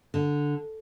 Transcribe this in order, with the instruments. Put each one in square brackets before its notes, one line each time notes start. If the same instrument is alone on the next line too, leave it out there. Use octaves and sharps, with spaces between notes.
[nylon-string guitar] D3